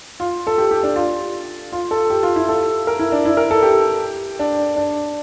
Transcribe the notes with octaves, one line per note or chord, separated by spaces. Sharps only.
F4
A4
G4
G4
D4
F4
F4
A4
G4
F4
E4
A4
A#4
E4
D4
E4
A#4
A4
G4
D4
D4